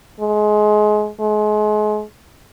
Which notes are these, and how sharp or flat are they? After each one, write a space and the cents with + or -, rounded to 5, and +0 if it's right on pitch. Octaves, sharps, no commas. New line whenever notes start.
G#3 +25
G#3 +35